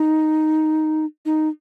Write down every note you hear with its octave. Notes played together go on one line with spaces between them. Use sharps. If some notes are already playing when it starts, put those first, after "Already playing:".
Already playing: D#4
D#4